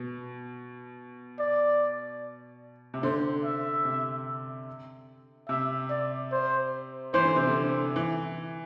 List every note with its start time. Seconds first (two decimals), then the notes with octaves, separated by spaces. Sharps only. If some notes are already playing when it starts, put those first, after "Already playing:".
Already playing: B2
1.39 D5
2.94 C3
3.03 D3 C5
3.45 E5
3.85 C3
5.49 C3 E5
5.90 D5
6.32 C5
7.14 E3 C5
7.25 D3
7.36 C3
7.47 D3
7.96 E3